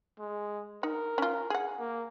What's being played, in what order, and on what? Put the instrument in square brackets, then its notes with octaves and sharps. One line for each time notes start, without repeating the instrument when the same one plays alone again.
[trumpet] G#3
[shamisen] D#4 [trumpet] A#4
[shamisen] C#4 F4
[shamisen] G#4 F#5 [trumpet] G#5
[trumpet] A#3